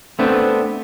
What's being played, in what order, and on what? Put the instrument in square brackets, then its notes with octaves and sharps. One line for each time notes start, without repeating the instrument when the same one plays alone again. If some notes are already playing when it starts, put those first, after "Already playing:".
[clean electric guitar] A3 B3 C4 D4